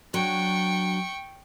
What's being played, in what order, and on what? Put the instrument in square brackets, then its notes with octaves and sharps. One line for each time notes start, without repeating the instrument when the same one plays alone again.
[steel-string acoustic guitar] F#3 D4 [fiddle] G5 C#6